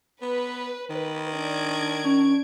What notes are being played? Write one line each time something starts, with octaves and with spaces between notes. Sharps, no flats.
B3 B4
D#3 B4
D4 G#6 D7
C#4